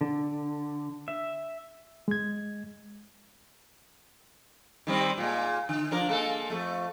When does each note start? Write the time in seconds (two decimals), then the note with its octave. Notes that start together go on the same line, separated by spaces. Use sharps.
0.01 D3
1.08 E5
2.08 G#3 G#6
4.87 D#3 G3 C4
5.18 A#2 G#3
5.69 D3
5.91 F3 D4 A#4
6.09 G#3 A#3 A4
6.50 F2 A3